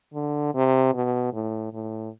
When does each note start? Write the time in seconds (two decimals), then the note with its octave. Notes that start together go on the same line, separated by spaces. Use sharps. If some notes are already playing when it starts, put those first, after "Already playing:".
0.14 D3
0.55 C3
0.94 B2
1.34 A2
1.73 A2